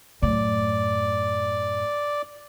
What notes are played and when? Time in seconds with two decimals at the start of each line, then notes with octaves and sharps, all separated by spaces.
0.22 F#2 A2 D5